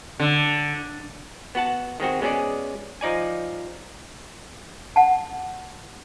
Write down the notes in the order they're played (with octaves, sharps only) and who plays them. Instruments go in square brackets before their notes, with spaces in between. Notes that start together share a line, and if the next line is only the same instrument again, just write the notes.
[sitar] D3
[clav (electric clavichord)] B3 F#4 F#5 A5
D#3 G#3 C4 F#4
G#3 B3 C#4 F#4 G#4 D5
F3 D#4 D5 G#5
[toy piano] F#5 A5